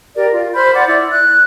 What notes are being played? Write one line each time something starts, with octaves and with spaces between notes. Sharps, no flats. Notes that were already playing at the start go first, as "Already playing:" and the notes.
G4 A#4 D5
F4
C5 B5 F6 G6
D5 F#5 D6
E4 D5
F#6